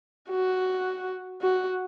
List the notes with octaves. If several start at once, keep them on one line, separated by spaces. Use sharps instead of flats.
F#4
F#4